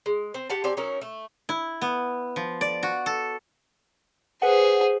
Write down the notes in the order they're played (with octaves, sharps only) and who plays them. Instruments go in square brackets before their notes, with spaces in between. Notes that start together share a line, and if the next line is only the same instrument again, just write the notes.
[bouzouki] G#3
C4
G4 F#5 A5
C4 G4 D5 G#5
F#3 C#4 D#4 A#4
A3
[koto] E4
B3
F3
D5
F#4
A4
[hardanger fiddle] G#4 C5 [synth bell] B4 F#5